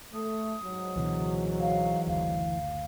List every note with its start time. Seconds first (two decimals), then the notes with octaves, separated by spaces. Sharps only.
0.13 A3 D#6
0.63 G#2 F#3
0.96 C#2 B2 D3 E3
1.59 F5
2.07 F#1 D2 F5